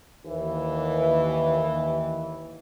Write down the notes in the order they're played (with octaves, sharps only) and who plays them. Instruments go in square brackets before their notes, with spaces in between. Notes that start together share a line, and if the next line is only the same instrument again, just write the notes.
[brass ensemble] D#2 E3